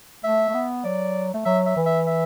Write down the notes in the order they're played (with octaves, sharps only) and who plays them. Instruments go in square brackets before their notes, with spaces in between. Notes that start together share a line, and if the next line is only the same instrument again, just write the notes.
[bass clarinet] A3 [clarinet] E5
[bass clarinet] A3
B3
[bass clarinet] F#3 [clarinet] D5
[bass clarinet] A3
[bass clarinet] F#3 [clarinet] E5
[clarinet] E5
[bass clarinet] E3
[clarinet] E5
E5